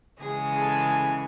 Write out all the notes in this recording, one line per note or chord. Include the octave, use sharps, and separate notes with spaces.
C#3 E3 G#3 G#4
A4